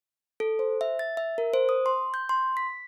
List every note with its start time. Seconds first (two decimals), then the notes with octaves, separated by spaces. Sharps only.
0.40 A4
0.59 C5
0.81 E5
0.99 A6
1.17 E5
1.38 A#4
1.54 C5
1.69 D#6
1.86 C6
2.14 G6
2.29 C6
2.57 B6